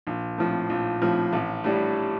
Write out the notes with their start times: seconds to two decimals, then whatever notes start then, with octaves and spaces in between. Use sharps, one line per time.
0.07 A#1
0.38 A2 F3
0.70 A#1
1.01 A2 F3
1.33 A1
1.64 A2 G3 D4